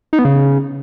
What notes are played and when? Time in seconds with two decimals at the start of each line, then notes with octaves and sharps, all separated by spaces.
0.13 D#4
0.19 B3
0.25 C#3